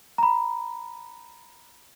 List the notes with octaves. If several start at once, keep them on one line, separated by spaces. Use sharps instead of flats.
A#5 B5